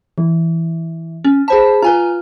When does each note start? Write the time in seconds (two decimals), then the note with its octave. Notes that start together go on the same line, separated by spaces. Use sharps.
0.18 E3
1.24 C#4
1.48 G#4 C5 A5 B5
1.82 F4 B4 G#5 A#5